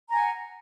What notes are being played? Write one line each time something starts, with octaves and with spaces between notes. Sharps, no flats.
F#5 G#5 A#5